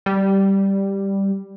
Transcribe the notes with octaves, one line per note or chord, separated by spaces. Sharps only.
G3